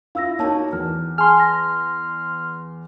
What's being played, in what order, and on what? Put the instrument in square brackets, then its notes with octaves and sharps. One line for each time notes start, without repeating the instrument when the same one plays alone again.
[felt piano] E4 F4 [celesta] F5 E6 A#6
[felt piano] A#3 D#4 F#4 [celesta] C#5 A5
[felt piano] E2 [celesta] F6
[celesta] G#4 G#5 A5 [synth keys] C6 F6
[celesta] A#6